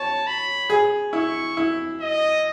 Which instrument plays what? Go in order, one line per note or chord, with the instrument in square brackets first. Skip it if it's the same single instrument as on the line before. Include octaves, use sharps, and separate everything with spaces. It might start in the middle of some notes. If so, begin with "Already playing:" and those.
Already playing: [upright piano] C#5 [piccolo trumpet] A5
[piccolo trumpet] B5
[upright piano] G#4
[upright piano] E4 [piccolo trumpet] C#6
[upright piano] E4
[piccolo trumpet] D#5